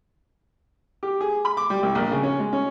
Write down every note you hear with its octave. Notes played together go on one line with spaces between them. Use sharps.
G4
G#4
B5
D6
G3
C2
A#1
C#3
C#4
G#3
C#4